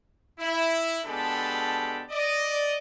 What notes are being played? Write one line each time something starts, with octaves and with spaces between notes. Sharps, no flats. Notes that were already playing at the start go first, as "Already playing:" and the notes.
E4
B2 G#3 D4 G4 A4 B5
D5 D#5